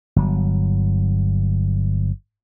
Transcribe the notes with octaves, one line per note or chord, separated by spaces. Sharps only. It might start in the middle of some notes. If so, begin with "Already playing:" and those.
G1 F#3